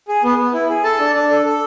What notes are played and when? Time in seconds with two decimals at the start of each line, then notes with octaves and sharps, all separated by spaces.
0.08 G#4
0.23 B3
0.39 B3
0.54 E4
0.69 G#4
0.84 A4 A5
1.00 D4
1.15 D4
1.31 A4
1.45 A4